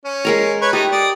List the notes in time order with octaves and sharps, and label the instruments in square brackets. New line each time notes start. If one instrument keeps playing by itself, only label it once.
[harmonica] C#4
[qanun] G#3 A#4 A#5
[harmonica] B4 C#5
[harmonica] A3 D#4 [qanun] G4
[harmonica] D5 D#6